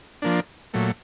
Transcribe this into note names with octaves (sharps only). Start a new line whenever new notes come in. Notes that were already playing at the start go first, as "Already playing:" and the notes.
F3 A#3 D4
A#2 F#3 A3